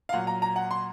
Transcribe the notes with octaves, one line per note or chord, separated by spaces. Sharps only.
F5
A#2 F#3 F#5
A#5
A#5
F#5
C6